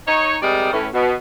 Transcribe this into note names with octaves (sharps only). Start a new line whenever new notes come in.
D#4 C#5
C3 G3 G#3 G#4 A#4 D5
A2 E3 C#4
B2